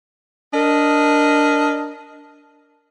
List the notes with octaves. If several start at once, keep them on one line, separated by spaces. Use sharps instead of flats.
D4 A#4 D#5